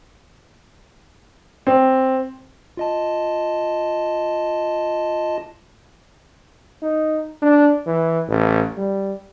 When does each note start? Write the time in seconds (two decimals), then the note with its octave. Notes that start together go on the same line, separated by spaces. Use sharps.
1.67 C4
2.77 F4 D#5 A5
6.82 D#4
7.42 D4
7.87 E3
8.28 A1
8.77 G3